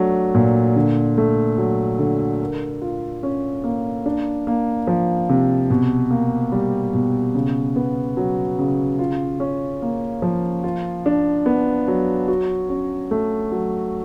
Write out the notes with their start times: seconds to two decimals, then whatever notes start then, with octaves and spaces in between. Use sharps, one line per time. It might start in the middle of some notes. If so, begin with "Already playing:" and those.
Already playing: F#3 A3 D4
0.34 A#2
0.76 D3
1.18 A3
1.58 F#3
1.99 D3
2.40 A#4
2.82 F4
3.23 C#4
3.64 A#3
4.06 D4
4.47 A#3
4.87 F3
5.29 C3
5.70 B2
6.11 A#3
6.52 G3
6.93 B2
7.35 C#3
7.76 B3
8.17 F#3
8.59 C#3
8.99 F4
9.40 C#4
9.82 A#3
10.22 F3
10.64 F4
11.06 D4
11.46 B3
11.88 F#3
12.28 F#4
12.69 C#4
13.11 A3
13.52 F#3